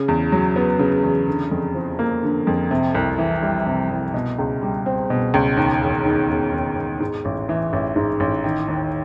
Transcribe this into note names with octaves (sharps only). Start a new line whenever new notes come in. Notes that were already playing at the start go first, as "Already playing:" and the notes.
Already playing: C#3
E2
F#3
B3
C#3
E2
D3
F2
F3
A#3
D3
F2
C3
C2
E3
G3
C3
C2
B2
C#2
G3
C4
B2
C#2
D#2
E1
D#3
E1
D#2
E1
G#2
A1
E3
A1
G#2
A1
D#3
D#2